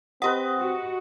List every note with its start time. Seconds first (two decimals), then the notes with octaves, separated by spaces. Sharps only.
0.22 C4 G4 B4 D#5 F#5
0.60 F#4